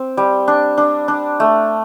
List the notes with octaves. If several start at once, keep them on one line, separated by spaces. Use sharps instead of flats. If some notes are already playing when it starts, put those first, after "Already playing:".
Already playing: C4
G3
D4
D4
D4
A3